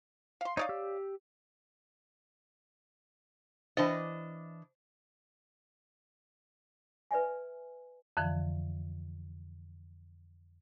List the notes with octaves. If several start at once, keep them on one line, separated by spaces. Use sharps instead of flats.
F5 C6
D#4 C#5 D5 F5 D#6
G4 E6
E3 D4 C5 D#5 G5 A5
B4 D5 E5 G#5
F2 D3 E3 F3